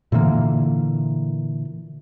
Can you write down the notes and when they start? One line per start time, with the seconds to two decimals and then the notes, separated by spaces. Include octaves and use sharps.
0.12 A#2 D3 E3 A#3